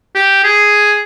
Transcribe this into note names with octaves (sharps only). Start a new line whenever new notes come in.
G4
G#4